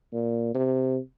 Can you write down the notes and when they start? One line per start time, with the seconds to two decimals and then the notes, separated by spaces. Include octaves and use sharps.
0.13 A#2
0.55 C3